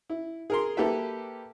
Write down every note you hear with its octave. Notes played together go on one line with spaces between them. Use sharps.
E4
G#4 A#4 C6
A#3 G4 A4 B4 E5